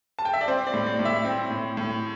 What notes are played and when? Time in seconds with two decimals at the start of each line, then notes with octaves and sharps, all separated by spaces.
0.19 A5
0.25 G5
0.33 E5
0.41 D5
0.48 C4 C5
0.67 D5
0.74 A2
0.86 D5
0.99 A2
1.05 E5
1.25 C4
1.50 A2
1.77 A2